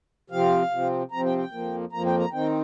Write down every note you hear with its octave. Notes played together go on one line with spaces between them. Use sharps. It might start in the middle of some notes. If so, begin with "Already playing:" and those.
C3 F3 C4 F5
C3 F3 C4
C3 F3 C4 A#5
G5
G5
F2 F3 A#3
F2 F3 A#3 A#5
G5
A#5
D#3 C4 D#4 G5